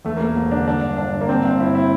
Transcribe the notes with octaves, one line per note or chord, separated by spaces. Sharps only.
E2 A3
A#3
E1 A3
E1
D3 D4
G2 D4
G1
G1 D4
D3
A#3
G2 C4
G1
G1 E4
D3 E4